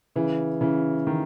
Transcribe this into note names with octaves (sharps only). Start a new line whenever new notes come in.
C#3 E3
C#3 E3
D#3